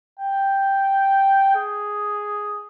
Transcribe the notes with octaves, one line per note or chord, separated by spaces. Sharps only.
G5
G#4